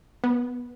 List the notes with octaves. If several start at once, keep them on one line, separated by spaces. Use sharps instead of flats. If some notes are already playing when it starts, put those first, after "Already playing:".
B3